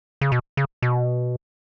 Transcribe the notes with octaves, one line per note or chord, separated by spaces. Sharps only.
C#3
B2
C#3
B2